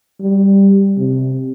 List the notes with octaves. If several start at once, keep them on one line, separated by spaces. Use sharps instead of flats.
G3
C3